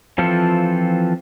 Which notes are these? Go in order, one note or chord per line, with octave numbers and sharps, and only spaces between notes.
E3 F3 C4 F4 A4